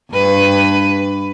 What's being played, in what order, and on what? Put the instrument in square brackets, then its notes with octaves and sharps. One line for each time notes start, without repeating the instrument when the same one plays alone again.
[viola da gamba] G2 B4